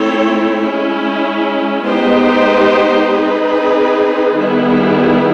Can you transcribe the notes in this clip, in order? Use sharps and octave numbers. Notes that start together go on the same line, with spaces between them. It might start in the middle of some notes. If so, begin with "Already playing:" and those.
Already playing: A3 C4 E4 A4 C#5
G#3 C#4 E4
G#3 B3 D#4 G4 C5
C4 D#4 G#4 B4
D#3 G3 B3 E4 G#4